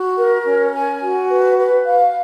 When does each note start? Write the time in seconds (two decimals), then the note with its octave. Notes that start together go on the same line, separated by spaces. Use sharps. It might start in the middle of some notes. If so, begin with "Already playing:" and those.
Already playing: F#4
0.16 A#4
0.44 C#4
0.73 G#5
1.01 F#4
1.29 B4
1.57 B4
1.86 F5